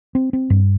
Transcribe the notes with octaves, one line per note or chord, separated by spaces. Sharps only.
C4
C4
G2